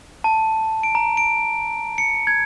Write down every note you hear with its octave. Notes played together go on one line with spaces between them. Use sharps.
A5
D7
A#5
D7
C#7
G#6